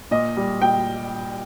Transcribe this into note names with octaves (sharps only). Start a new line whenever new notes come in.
A#2 D#5
G3
A#2 G5